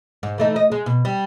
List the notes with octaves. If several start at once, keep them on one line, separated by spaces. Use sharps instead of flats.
G#2
E3 A3 D#4
D#5
G#3
B2
G3